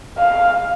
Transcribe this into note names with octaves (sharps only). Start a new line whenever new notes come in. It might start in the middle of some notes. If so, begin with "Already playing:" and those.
F5